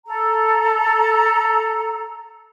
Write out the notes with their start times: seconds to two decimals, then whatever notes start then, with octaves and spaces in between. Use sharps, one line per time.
0.05 A4 A#5